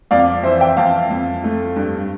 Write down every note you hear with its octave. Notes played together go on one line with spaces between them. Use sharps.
F2 D5 F5
E3 C5 E5
E5 G5
F2 F5 A5
F2
A3
G2